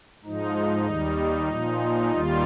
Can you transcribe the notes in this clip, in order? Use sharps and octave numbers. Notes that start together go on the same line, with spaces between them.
G#2 F3 D#4
D#2 D#3 G3
A#2 F3
D#2 D#3 G3 F4